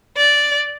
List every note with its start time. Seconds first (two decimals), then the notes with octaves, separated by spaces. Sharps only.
0.17 D5